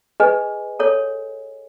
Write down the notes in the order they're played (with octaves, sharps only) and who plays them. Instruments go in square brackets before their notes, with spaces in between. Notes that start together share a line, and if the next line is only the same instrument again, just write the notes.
[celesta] G#4 D#5 G#5 [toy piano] B4
[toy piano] A4 C#5